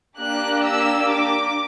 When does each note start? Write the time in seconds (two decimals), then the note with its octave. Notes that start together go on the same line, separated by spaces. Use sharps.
0.18 A#3 D4 G4 F#6
0.65 E6
1.12 D6